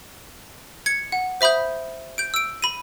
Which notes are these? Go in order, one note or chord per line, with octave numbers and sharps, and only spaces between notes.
G#6 C#7
F#5
C5 E5 B5 D#6 G6
G6 D7
E6 D7
B5 D#7